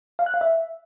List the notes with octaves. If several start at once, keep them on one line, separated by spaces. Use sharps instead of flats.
F5
F#6
F5
E5